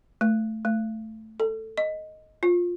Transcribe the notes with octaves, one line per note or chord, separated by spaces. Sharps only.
A3
A3
A4
D#5
F4